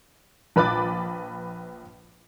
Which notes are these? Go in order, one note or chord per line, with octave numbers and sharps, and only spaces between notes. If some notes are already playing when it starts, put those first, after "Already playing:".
A#1 B4 B5 D6 A6